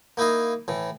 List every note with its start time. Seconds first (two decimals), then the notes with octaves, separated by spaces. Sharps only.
0.17 A#3 D#4 E4 D#5 F5
0.68 A2 E3